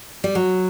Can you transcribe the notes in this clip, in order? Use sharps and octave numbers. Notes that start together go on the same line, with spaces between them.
G3
F#3